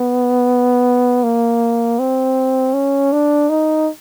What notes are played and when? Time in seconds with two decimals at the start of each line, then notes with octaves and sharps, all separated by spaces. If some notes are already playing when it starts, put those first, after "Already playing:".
Already playing: B3
1.23 A#3
1.99 C4
2.74 C#4
3.12 D4
3.50 D#4